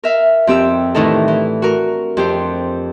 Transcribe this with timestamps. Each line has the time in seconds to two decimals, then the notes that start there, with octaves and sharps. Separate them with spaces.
0.04 A#4 E5 F5
0.47 F2 C4 G4 E6
0.95 A2 D#3 E3 D4 D#4 A4
1.28 E3
1.62 F#4 A#4
2.17 F2 G4 C5